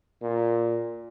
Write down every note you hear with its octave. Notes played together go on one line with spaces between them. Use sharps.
A#2